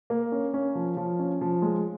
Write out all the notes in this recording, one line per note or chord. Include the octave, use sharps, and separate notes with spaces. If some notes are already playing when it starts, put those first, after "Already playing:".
A#3
C#4
C#4
F3
F3
C#4
F3
G#3